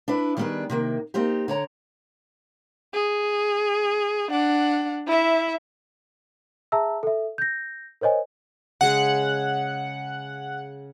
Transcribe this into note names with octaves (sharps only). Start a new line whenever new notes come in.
D4 E4 B4
D#3 G3 B3 D4 G#4 B4
C3 D#3 A#3
A#3 C4 D#4 G4
D3 C#5 A#5
G#4
D4 F#5
E4 E5
G#4 E5 A5 A#5 E6
A4 E5
G6 A#6
A#4 C5 C#5 D#5 G#5
C#3 G#3 G#4 F#5